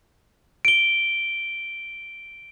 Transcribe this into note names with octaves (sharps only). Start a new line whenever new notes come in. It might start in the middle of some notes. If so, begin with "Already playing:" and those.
D7 G7